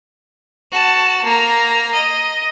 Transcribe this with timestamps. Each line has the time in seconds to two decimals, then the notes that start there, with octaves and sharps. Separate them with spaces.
0.71 F#4 A5
1.24 A#3 A#5
1.93 D#5